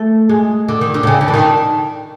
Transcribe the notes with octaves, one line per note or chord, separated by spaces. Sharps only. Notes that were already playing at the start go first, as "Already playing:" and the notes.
Already playing: A3
G#3
D3
D#3
D3
C3
C#3
D3
E3
D#3